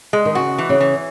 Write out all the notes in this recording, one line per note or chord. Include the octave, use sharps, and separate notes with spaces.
G#3
D#3
C#3 F#4
E3
C#3
E3